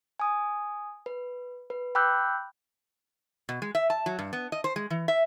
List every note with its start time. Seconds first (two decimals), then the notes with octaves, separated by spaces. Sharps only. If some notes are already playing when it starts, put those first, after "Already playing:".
0.20 G#5 D#6
1.06 B4
1.70 B4
1.95 G5 B5 D6 E6 F#6 G6
3.49 B2
3.62 G#3
3.75 E5
3.90 A5
4.06 F#3
4.19 G2
4.33 B3
4.52 D#5
4.64 C5
4.76 G#3
4.90 E3
5.08 E5